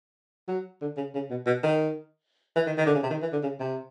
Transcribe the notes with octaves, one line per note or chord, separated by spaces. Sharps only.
F#3
D3
C#3
C#3
B2
B2
D#3
E3
D#3
D#3
D3
C#3
C3
D#3
E3
D3
C#3
C3